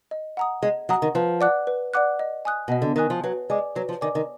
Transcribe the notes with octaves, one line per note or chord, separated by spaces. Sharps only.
D#5
F#5 A#5 D#6
G#3 D#5
F#3 F#5 A#5 D#6
D#3
F3 B4
D5 F#5 D6 F#6
B4
D5 F#5 D6 F#6
D#5
G#5 D#6 F#6
B2 D#5
D3
D#3 G#5 D#6 F#6
F3
F#3 B4
G#3 D5 G#5 D6
F#3 B4
F3
D#3 D5 G#5 D6
D#3